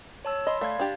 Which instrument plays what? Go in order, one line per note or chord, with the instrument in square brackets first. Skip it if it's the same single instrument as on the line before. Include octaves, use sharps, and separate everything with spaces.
[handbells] C#5 A5 E6
[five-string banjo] D#5 [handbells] B5 C6
[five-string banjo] A3 [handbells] D5 F5 G#6
[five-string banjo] D4 G4